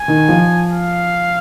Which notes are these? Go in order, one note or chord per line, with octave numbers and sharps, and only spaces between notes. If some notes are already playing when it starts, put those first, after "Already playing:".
Already playing: G#5
D#3
F3
F5